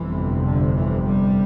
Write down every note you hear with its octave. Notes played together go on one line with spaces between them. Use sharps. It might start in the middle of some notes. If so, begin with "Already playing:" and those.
Already playing: G1 F2 C3 E3
D3
E3
G3